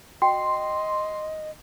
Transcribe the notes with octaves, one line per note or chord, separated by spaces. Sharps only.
F#4 D#5 G5 C6